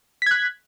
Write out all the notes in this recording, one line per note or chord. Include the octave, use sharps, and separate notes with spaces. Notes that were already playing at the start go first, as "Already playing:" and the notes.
F#6 G#6 B6